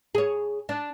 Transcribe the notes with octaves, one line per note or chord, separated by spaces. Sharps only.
G#4 C#5
D4